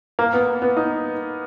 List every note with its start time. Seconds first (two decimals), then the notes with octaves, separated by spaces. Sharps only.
0.19 A#3
0.33 B3
0.62 B3
0.77 D#4